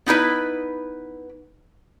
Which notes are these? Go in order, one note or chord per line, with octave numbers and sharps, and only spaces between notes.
B3 D#4 E4 B4